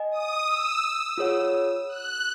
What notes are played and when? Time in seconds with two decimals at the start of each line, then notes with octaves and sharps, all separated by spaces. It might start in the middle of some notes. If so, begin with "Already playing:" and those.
Already playing: D#5 G#5
0.11 D#6
0.47 E6
1.18 F4 G#4 C#5 F#5
1.89 F#6